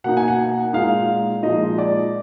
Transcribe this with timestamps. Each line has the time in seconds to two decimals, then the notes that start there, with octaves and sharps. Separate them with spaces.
0.04 B2 A#3 D#4 F#5
0.17 G#5
0.28 F#5
0.73 A#2 G#3 D#4 F5
1.43 A#2 F3 G#3 D#4 D#5
1.78 D5